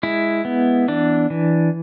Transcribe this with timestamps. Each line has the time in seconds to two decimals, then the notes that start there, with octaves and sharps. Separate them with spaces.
0.03 G#3 E4
0.45 B3
0.88 E3 D4
1.30 E3